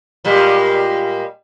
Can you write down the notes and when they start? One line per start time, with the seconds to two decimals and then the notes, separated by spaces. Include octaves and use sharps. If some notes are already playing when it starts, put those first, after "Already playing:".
0.24 A#2 G3 G#3